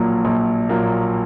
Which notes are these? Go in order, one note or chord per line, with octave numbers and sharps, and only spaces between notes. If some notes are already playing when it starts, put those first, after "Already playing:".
Already playing: A#1 A#2 F#3 A#3
A#1
A#2 F#3 A#3